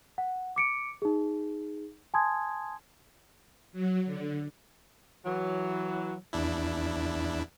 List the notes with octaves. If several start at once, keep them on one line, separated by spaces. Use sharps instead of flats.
F#5
D6 C#7 D7
D#4 G#4
G#5 A5 C6 D#6 G#6
F#3
D3
E3 F#3
E2 D4 E4